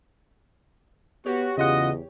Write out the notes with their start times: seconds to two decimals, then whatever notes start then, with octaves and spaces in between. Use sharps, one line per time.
1.26 B3 F#4 G4 C#5
1.58 E2 C#3 F4 D#5 F#5